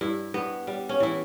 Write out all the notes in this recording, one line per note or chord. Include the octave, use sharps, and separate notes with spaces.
G2 E4
G2 B3
G3
C#4
E3 E4